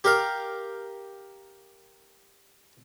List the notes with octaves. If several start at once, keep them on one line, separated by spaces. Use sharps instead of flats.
G4 A#4 F5